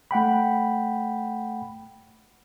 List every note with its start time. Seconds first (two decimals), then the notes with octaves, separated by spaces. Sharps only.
0.11 A3 F#5 G5 B5